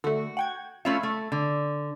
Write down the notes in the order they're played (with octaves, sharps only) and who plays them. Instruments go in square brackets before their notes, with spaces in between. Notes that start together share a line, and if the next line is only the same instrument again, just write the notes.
[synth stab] D3 A3 [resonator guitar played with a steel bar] F#4
[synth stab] F#5 G5 G#6
[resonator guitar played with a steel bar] A3 C#4 F4 [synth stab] E5 B5
[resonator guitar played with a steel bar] A3
D3